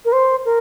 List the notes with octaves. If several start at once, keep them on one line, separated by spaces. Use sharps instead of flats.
A#4
C5
A#4